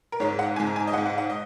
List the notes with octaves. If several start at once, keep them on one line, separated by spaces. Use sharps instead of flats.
A#4
G#2 G#3 C#5
F#5
G#2 G#3 G#5
A#5
G#5
D#5
G#2 G#3 F#5
F#5
F#5
D#5